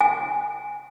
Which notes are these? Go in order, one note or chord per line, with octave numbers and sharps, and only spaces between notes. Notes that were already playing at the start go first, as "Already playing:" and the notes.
G#5